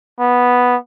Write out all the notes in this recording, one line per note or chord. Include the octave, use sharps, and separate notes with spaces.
B3